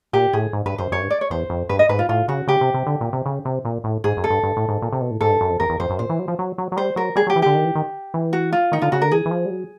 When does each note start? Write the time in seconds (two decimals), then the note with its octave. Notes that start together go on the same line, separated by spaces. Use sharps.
0.13 A#2 G4
0.33 A2 G#4
0.53 G#2
0.66 G2 B4
0.78 F#2 C5
0.92 F#2 C#5
1.02 G2
1.10 D5
1.21 C#5
1.30 E2 C5
1.50 F2
1.69 G2 B4
1.79 D#5
1.89 G#2 B4
1.99 F4
2.09 A2 F4
2.28 C#3 F#4
2.47 C#3 G4
2.61 C3
2.74 C3
2.87 D3
3.01 A#2
3.13 C3
3.26 C#3
3.45 C3
3.65 A#2
3.84 A2
4.04 G#2 G#4
4.17 F#2
4.24 A4
4.30 G2
4.43 G2
4.57 A2
4.69 G#2
4.82 A#2
4.92 C3
5.01 B2
5.11 A2
5.21 G#2 A4
5.30 G2
5.41 F#2
5.50 F2
5.60 E2 A#4
5.70 E2
5.80 F2 C5
5.90 F#2
5.99 A#2 C5
6.09 E3
6.19 F#3
6.28 F3
6.39 F#3
6.58 F#3
6.72 F#3
6.77 G3 C5
6.96 F#3 A#4
7.16 G3 G#4
7.27 F#3
7.30 G4
7.36 E3
7.42 D3 G4
7.55 D#3
7.65 E3
7.75 D#3
8.14 E3
8.33 F#4
8.52 F4
8.72 D#3 D#4
8.82 D3 F4
8.92 C#3 F#4
9.02 D3 A#4
9.11 E3 G#4
9.26 E3
9.31 F3
9.46 G3
9.51 F#3